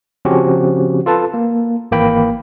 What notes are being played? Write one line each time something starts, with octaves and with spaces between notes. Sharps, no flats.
C#3 F3 C4 C#4 F#4 G4
F4 A4 B4 A5
A#3
G#1 E3 A#3 G5 B5